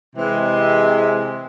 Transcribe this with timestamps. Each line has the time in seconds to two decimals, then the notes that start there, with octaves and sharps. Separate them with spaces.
0.16 C3 E3 G#3